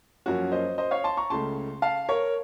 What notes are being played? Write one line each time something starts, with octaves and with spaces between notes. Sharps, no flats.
F#2 F3 A#3 C#4 F#4
C5 D#5
C5 D#5
C#5 F5
A5 C6
A#5 C#6
C#2 C#3 A3 C#4 A5 C6
F5 A5
A#4 C#5